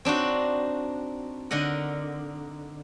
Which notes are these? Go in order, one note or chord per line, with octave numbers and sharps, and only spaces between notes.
C4 D4 D#4 F#4
D3 D#4 A#4 D#5 F#5